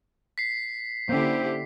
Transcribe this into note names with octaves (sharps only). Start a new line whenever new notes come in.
B6 C7
D3 A#3 C#4 E4 G4 C5